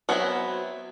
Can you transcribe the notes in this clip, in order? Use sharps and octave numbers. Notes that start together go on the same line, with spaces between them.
F#3 B3 C4 D4 E4